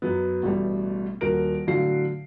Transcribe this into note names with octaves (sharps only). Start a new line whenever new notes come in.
F#2 F#3 B3
A1 B2 G3 A3
D#1 F#4 A#4 D7
A2 D3 F#3 F#4 F5 C7